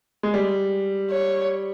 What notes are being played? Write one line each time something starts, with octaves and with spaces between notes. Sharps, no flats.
G#3
G3
C#5